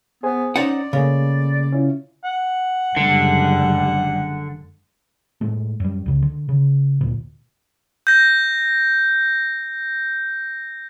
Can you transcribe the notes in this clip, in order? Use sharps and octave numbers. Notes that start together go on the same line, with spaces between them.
B3 G#4 C5 G#5
C#4 D#4 C5 D5 F#5
C#3 A3 A#3 G#4
C#4 E4 F4
F#5
F#1 D3 G3 G#3
A2 G#3 A3
F#2 G3
C#2 C#3
D3
C#3
D2 A#2
G6 A#6